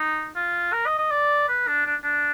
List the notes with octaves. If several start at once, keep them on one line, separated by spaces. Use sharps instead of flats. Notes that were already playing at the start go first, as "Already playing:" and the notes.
Already playing: D#4
F4
A#4
D#5
D#5
D5
B4
D4
D4
D4